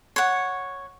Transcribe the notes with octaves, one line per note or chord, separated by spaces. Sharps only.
C#5 F#5